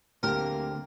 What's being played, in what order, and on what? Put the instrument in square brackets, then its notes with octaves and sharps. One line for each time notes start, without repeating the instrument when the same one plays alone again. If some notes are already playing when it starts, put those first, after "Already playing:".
[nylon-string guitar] D2 G4 [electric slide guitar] D3 C4 [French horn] A#3 [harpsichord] A#4